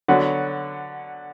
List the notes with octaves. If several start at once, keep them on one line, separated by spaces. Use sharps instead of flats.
D3 F#3 B3 F#4